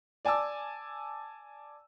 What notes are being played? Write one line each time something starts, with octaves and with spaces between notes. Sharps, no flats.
D5 G#5 A5 D6 E6